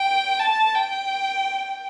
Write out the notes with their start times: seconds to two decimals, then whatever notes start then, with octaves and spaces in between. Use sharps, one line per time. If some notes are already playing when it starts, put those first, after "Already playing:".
Already playing: G5
0.39 A5
0.75 G5